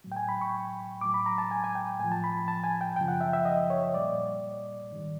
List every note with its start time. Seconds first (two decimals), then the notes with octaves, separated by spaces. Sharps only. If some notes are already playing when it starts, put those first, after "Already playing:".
0.04 A2 F#3
0.12 G5
0.16 G#5
0.29 B5
0.41 C#6
1.01 A2 F#3 D6
1.14 B5
1.26 A#5
1.38 A5
1.51 G#5
1.64 G#5
1.75 G5
2.00 A2 F3 G#5
2.12 A5
2.24 B5
2.48 A5
2.64 G#5
2.81 G5
2.96 F#2 C#3 F3 G5
3.08 F#5
3.21 E5
3.33 E5
3.45 D#5
3.70 C#5
3.94 A#2 G3 D5
4.91 G#2 D#3 G3